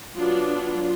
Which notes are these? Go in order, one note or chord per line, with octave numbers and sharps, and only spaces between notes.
F#3 B3 D4 F4
F4